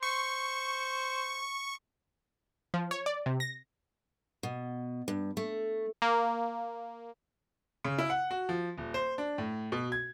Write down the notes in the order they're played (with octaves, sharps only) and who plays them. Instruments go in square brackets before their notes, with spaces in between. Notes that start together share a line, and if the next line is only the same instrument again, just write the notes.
[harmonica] C5 [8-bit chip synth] C#6
[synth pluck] F3
C#5
D5
C3
A#6
[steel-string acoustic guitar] B2
G2
A3
[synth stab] A#3
[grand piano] C#3
E4
F#5
F#4
F3
D#1
C5
D4
A2
B2
G#6